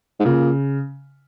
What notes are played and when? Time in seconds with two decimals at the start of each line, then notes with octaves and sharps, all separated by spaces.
0.20 G#2
0.25 A#2 C#3